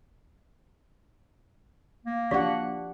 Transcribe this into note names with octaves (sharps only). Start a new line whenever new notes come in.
A#3
F3 D4 G4 D5 F5 F#5